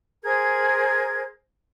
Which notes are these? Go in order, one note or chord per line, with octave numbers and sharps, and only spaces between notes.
G#4 A#4 C5 G#6